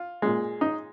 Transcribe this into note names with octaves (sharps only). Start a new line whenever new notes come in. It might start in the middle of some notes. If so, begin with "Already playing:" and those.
Already playing: F4
A#2 G#3
D#4